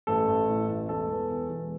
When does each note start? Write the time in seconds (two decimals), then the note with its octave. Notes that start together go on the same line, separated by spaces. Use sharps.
0.07 A1 A4
0.28 A1
0.49 A2
0.68 A1
0.88 E1 A4
1.09 E2
1.30 E2
1.49 E1